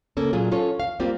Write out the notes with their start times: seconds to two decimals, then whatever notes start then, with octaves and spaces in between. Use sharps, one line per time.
0.17 C#3 A#3 C#4 A4
0.33 A#2 F#3 F4 G#4
0.51 C#4 F4 A4 C#5
0.80 F5
1.00 G3 A#3 C4 F4 G4